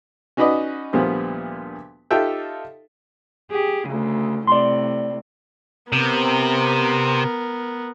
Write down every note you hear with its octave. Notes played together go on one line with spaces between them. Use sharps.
C#4 D#4 F#4 B4 D5 D#5
D2 A#2 F3 G3 B3
D#4 F4 G4 A4 E5 G5
G4 G#4
D2 C#3
A2 C3 D5 C6
C3 B3 A#4